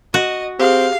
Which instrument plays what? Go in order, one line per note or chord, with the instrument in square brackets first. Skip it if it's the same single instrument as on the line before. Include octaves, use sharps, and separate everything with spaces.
[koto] F#4 [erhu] D#5
[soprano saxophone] C4 [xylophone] G4 G#4 [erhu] F5